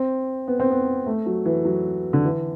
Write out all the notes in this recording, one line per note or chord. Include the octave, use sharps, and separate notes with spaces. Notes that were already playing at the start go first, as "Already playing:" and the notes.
Already playing: C4
B3
C4
B3
A3
F#3
E3
F#3
D3
E3